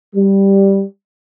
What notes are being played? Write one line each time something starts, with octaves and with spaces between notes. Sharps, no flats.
G3